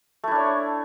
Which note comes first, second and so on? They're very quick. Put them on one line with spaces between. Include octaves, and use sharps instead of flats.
A3 E4 D4 C#5